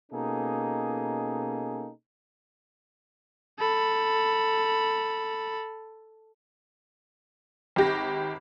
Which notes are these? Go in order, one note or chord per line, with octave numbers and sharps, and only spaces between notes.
B2 A#3 C#4 D#4 G#4 A4
A4 B5
G#1 G4 A#6